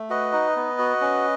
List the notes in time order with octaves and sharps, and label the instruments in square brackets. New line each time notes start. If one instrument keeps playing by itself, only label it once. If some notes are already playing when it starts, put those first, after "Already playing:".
Already playing: [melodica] A3
F#4 B4 D#5
D#4
B3
F#4
C#4